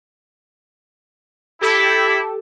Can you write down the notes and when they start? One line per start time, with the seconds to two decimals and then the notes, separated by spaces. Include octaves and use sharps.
1.61 E4 G4 A4